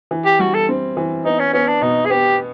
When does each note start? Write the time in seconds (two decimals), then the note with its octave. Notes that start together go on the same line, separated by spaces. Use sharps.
0.11 E3
0.26 G4
0.39 G3 F#4
0.54 A4
0.69 C4
0.97 E3
1.25 B3 D#4
1.40 C#4
1.53 B3 C#4
1.67 D4
1.82 B2 D#4
2.06 G#4
2.10 B3 G4